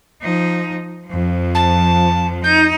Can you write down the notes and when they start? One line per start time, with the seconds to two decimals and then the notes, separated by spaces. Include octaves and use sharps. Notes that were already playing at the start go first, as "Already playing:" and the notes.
0.22 F3 D#4
1.06 F2 F3
1.55 A5
2.44 D#4 G6